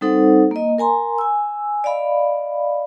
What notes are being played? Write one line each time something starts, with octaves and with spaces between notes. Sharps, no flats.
G3 C4 D#4 A4 C5 F#5
A#3 D#5
A#4 G#5 A#5 C6
G#5 E6
D5 D#5 F5 B5